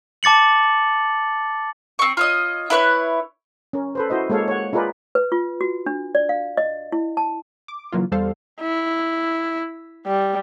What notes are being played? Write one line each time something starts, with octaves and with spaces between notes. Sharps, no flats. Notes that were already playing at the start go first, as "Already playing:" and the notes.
A5 D6 A6 C#7 F#7
C4 C#6
F4 C#5 D#5
E4 B4 C#5 F#6
C#4 A#4
A4 B4 C5
E4 F#4 C5 D#5
G#3 A#3 A4 C#5 F5
C#5 F#5
D#4 F4 G#4 A#4 B4 D5
B4
F4
F#4
D4
D5
F5
D#5
E4
A5
D6
C#3 E3 F#3 A#3 F4
E2 G3 A4 C5 F5
E4
G3